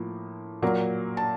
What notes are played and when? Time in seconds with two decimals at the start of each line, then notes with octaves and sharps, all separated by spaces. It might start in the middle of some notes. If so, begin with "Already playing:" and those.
Already playing: A2 F3 A#3
0.62 A#2 F#3 A#3
1.17 A5